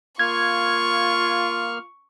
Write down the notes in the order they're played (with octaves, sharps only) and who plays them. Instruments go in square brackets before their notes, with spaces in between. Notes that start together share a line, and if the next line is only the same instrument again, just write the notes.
[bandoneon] A#3 F6 [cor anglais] F4 [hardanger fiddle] C#6 [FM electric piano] G#6